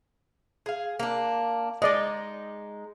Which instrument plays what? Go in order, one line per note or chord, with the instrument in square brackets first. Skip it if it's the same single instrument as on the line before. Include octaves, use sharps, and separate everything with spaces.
[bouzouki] G#4 F5
A#3 D4
[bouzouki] G#3 D#4 [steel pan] D5 D#5